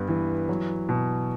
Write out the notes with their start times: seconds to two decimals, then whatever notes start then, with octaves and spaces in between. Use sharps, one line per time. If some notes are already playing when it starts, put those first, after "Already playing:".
Already playing: G2 B3
0.08 E3
0.49 F#3
0.89 B2